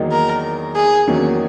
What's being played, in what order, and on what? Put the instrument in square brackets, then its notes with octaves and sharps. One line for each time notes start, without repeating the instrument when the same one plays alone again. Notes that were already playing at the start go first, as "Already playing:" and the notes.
Already playing: [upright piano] E2 D#3 F#3 A#3 D#4
[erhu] A#4
G#4
[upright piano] E2 D#3 F#3 A#3 C#4